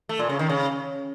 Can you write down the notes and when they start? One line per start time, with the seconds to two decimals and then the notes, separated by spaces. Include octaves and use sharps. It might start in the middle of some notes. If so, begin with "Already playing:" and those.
0.09 A3
0.19 A#2
0.29 C#3
0.39 D#3
0.49 C#3